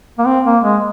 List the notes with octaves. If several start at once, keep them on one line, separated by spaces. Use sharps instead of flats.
A#3
C4
A#3
G#3